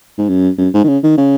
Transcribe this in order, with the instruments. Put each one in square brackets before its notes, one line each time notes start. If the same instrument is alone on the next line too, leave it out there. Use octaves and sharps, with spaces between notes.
[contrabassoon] G#2
F#2
F#2
G#2
D#3
C#3
D#3
C#3